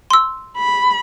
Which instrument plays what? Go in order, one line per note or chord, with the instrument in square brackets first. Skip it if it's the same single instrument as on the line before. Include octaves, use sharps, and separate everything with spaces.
[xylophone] C6 E6
[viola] B5